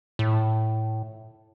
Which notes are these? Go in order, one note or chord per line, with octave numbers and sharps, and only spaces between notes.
A2